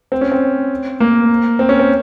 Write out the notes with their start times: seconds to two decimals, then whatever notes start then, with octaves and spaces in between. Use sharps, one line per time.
0.12 C4
0.21 C#4
0.32 C4
1.00 A#3
1.59 C4
1.69 C#4
1.79 C4